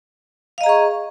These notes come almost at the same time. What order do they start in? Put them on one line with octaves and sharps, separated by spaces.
F5 D#5 A#5 G#4 C#6